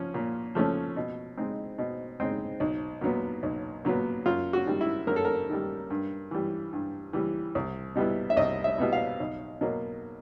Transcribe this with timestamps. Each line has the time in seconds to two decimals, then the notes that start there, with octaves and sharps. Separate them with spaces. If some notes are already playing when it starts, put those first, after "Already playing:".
Already playing: F3 C#4
0.14 A#2
0.55 F3 A3 C#4
0.96 B2
1.37 G#3 C4 D#4
1.78 B2
2.20 G#3 C4 D#4
2.60 B1
3.01 A#2 F#3 B3
3.43 B1
3.85 A#2 F#3 B3
4.26 F#2 F4
4.53 F#4
4.67 D#3 G3
4.81 E4
5.07 F#2 A#4
5.16 A4
5.25 A#4
5.50 D#3 G3
5.90 G2
6.31 E3 G3
6.73 G2
7.13 E3 G3
7.55 C2
7.95 B2 G3 B3 E4
8.30 E5
8.37 C2 D#5
8.64 E5
8.78 B2 G3 B3 E4
8.93 F5
9.20 B1
9.61 B2 F#3 A#3